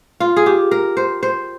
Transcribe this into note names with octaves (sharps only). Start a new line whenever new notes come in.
F4
G#4
G4
A#4
C5
C5